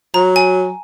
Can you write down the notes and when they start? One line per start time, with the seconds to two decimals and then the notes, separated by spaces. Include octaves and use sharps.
0.14 F#3 A#5
0.36 G#5